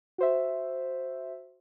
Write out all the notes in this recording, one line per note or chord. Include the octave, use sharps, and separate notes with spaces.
F#4 C5 E5